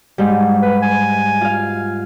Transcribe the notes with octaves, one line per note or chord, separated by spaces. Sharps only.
G#2 G3
B4
G#5
F4 F5